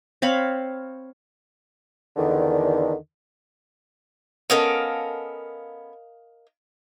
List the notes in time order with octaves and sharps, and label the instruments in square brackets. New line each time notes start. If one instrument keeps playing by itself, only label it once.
[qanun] C4 C#5 F5 B5
[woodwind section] E2 D3 D#3
[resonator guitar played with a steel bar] B3 C#4 A4 [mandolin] A#4 D#5 F5